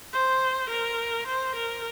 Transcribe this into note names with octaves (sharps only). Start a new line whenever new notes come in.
C5
A#4
C5
A#4